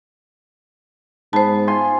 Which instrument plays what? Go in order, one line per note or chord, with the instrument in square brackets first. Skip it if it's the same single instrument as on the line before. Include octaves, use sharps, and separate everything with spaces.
[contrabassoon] G#2 [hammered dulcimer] B3 [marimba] C5 A5
[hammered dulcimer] F4 G#5 C6